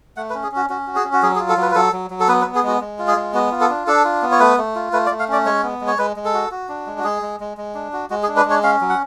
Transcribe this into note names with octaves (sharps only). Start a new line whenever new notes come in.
A3 F#5
B4
C#4
G#4
C#4 F#4
C#4 F#4
F#4
G#4
C#4
F#4
F#3 G#4
G#4
F4
A4
F#3 B4
B4
F#3 A4
F#3
F#3
A4
B3 B4
B4
B3
G#4
G#3 F#4
G#3
F4
G#4
G#3
B3 F#4
F4
A4
D4
D4 A4
F4
B3
C#5
A3 B4
A3
F4
A3 B4
D5
A3
F5
C#4 D5
G#3 C#5
B3
G#3
C#5
G#3 B4
G#3
A4
F#4
F#4
D4
G#3
F#4
G#3 G#4
G#3
G#3
G#3
D4
F#4
G#3 F#4
G#4
D4
B4
G#3 C#5
C#4 F5
F#3
F#5